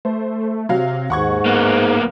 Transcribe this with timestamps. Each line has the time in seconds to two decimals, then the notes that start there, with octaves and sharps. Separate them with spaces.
0.05 A3 C5
0.69 C3 F#3 F5
1.10 D#2 G#2 F#5 C#6 G#6
1.46 D1 A#3 B3